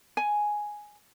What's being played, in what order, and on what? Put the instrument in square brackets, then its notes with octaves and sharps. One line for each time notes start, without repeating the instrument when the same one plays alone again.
[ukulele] G#5